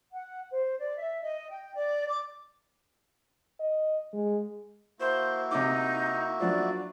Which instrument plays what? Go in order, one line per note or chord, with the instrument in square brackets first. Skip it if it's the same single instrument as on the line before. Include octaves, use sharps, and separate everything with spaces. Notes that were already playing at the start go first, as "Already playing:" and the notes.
[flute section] F#5
C5
D5
E5
D#5
G5
D5
D6
[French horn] D#5
G#3
[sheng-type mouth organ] A#3 E4 F#4 [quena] C5
[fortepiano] C3 D6 [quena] D#4
[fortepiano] F3 F#3 D4 [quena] D5